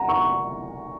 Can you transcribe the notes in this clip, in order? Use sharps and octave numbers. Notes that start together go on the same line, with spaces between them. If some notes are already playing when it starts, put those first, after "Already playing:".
Already playing: F#5 A#5
C#6